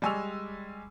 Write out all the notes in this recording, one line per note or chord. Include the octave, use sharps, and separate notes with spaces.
G3 G#3 G#5 C#6 E6 F7